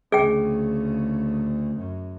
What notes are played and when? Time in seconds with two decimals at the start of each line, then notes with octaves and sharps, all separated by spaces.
0.12 D2 C#3 G#4 G5
1.76 F#2